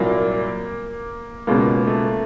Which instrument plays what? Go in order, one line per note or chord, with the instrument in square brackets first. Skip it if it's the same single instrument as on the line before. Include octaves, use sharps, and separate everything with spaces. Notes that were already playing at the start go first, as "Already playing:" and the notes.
Already playing: [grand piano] C2 A#2 F#3 [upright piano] A#3
[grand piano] C#2 B2 G#3 C#4 [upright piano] A#3
[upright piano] A3